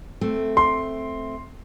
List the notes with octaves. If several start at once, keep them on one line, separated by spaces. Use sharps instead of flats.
A3 C4
C6